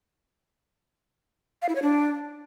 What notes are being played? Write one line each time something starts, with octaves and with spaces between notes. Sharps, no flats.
F5
E4
C#5
D4